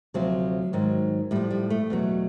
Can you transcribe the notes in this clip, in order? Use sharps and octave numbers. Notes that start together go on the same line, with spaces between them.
D2 C3 F3 F#3
G#2 D#3 F#3
A2 F3 G3
G3
A3
E2 B2 F#3